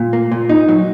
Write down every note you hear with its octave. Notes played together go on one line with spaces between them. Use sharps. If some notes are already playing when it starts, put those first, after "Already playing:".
Already playing: A#2
A#3
A#2
D#4
F#3